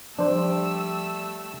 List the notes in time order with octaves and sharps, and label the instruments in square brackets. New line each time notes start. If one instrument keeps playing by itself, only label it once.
[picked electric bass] F3 [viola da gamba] G3 [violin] A3 E6 [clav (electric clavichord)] D4 C5